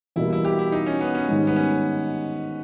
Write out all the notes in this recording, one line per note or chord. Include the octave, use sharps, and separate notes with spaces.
E2 B2 G3 A#3 E4
E4
G4
E4
D#4
C#4
B3
C#4
G#2 D#3 G3
B3
C#4